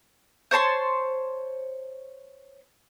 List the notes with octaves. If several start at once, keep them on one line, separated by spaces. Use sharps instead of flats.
C5 C#5 A5 C6